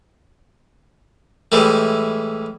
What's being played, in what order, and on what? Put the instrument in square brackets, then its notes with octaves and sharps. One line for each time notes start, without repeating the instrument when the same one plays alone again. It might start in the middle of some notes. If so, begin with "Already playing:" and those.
[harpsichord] A2 E3 G3 G#3